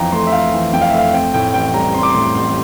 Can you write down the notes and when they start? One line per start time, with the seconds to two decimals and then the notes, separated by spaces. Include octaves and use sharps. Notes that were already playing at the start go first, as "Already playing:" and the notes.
Already playing: F2 E3 C4 F5 G5 A#5
0.12 A3 C6
0.27 E5
0.32 C4 F5
0.53 E3
0.73 F2 G5
0.82 F5
0.90 A3 E5
0.98 F5
1.13 C4 G5
1.34 A2 G5
1.54 A1 G5
1.74 G3 A#5
1.94 C4 C6
2.03 D6
2.10 A2 C6
2.35 A1 C6